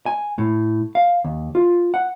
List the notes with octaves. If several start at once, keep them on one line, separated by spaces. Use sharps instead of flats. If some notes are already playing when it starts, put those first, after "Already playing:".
G#5
A2
F5
D#2
F4
F#5